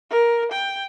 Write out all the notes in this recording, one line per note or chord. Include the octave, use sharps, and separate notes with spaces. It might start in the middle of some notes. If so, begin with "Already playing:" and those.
A#4
G5